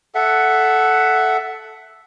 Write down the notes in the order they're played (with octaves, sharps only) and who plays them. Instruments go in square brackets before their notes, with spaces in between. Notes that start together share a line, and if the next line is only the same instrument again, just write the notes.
[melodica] A4 E5 F#5